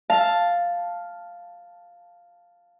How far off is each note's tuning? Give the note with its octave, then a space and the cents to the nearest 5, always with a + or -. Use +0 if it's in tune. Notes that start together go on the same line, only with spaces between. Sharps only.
F5 +0 A5 +0